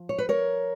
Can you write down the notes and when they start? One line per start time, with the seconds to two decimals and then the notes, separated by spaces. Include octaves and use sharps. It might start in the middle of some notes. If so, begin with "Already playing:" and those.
Already playing: F3
0.09 C#5
0.18 B4
0.29 A#4 C#5